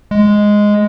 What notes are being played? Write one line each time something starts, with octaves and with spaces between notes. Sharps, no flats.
G#3